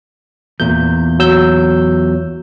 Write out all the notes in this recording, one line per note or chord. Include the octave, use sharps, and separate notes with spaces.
E2 A#2 G6
F#3 E6 G6